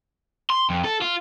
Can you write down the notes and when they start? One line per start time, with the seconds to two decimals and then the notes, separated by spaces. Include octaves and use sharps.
0.50 C6
0.70 F2
0.84 A4
1.02 F4